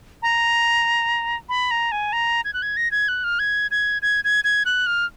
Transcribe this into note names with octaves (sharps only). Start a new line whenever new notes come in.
A#5
B5
A#5
G#5
A#5
G#6
F#6
G#6
A#6
G#6
F#6
F6
G#6
G#6
G#6
G#6
G#6
F#6
F6